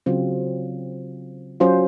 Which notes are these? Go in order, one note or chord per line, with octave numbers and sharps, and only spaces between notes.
C#3 F#3 C4 F4
F#3 C#4 F4 C5